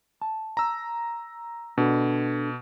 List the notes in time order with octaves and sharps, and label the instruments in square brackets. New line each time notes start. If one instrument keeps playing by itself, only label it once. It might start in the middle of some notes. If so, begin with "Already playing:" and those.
[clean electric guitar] A5
[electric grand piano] A#5 E6
[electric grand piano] B2 [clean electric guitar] D4 A4